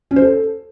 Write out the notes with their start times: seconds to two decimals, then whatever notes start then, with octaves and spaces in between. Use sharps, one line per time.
0.11 C#4
0.16 C5
0.22 A4